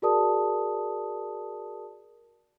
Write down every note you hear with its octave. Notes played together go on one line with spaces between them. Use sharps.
F#4 G#4 A#4 D5 A5 D#6